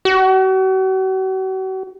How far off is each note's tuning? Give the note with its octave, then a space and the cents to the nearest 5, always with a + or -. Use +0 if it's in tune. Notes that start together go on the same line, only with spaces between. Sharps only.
F#4 +40